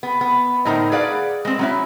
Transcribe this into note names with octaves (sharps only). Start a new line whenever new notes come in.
B3
B3
A2 D3 D#4 A#4 C5
G#4 B4 D5 F5 F#5
G#3 C4
F#3 C#4 E4